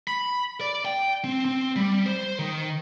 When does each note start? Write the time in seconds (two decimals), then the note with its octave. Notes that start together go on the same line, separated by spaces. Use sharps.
0.07 B5
0.61 D5
0.85 G5
1.24 C4
1.45 C4
1.76 G3
2.06 C5
2.39 D#3